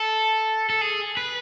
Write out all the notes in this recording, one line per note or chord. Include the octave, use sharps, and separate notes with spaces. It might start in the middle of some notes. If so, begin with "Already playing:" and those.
Already playing: A4
A4
G#4
B4